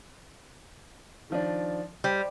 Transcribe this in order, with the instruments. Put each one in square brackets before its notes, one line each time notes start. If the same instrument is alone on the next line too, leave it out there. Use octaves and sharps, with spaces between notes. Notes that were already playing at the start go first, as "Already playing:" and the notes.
[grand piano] D#3 F3 D4
[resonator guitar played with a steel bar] G3 [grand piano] C5